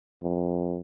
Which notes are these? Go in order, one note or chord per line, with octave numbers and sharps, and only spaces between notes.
F2